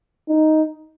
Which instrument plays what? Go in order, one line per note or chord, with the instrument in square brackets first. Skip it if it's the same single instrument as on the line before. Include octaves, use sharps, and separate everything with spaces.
[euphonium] D#4